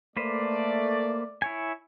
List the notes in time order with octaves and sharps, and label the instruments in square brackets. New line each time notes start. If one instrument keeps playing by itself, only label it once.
[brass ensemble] A3 D5 [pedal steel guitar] A#3 B4 C5
[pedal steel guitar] E4 C#5 G#5